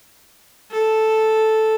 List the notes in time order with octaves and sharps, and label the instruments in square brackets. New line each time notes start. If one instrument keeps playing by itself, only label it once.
[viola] A4